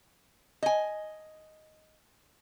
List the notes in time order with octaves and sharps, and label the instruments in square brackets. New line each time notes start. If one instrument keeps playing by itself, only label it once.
[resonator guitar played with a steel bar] D#5 G#5